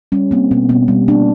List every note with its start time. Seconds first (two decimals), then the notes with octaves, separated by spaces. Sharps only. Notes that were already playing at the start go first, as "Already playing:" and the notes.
0.12 G3 C#4
0.31 A#3 C4
0.51 B2 B3
0.69 B2 B3
0.88 G3
1.08 A#3 D4